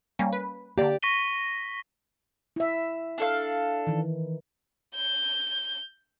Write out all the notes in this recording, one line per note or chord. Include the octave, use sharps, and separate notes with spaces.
G3 A#3 C#4
B4
D3 A#3 G4 D5
C#6 A#6 B6 D#7 G7
E4 E5
D4 A4 F5
D#3 E3
G6